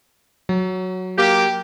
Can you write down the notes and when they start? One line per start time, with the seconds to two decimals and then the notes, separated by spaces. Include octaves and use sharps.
0.49 F#3
1.18 A#3 G4